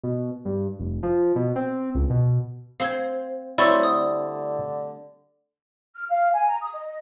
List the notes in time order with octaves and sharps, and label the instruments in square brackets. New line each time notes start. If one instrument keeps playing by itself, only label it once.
[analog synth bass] B2
G2
F1
F3
B2
C4
C#2
B2
[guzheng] C4 C5 [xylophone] F5 G#6
[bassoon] F#3 [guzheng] G3 A3 C4 [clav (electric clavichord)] E4 [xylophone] D5 C6 C#6
[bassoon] D3 [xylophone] D#6
[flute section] F6
F5
G#5
A#5
D#6
D#5
D#5